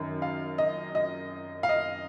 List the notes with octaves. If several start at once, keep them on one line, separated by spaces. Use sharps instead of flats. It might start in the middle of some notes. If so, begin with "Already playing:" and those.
Already playing: F#2 D#3 F#3 C#4
F5
D#5
D#5
F5
D#5